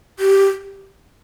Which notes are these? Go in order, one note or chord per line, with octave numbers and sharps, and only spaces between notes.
G4